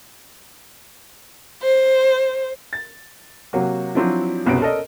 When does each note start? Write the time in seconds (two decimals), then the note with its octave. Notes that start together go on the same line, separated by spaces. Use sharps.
1.62 C5
2.73 A6
3.53 C3 F#3 A#3 F#4
3.95 F3 F#3 C4 D4 E4
4.46 F#1 C2 B2 B3 C#4 D7
4.61 C#4 A4 A#4 D5 D#5